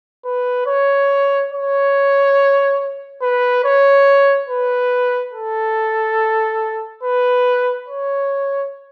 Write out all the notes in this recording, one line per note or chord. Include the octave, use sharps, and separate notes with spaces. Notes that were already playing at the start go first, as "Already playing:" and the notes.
B4
C#5
C#5
B4
C#5
B4
A4
B4
C#5